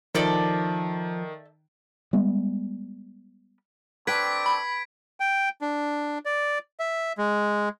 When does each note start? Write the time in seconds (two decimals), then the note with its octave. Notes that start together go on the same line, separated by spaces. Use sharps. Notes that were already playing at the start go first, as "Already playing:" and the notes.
0.15 D#3 F3 A4 D5 E5
2.13 G3 G#3 B3
4.07 A3 C4 D4 B4 G5 G#6 B6 D7
4.46 B5
5.20 G5
5.61 D4
6.25 D5
6.79 E5
7.18 G#3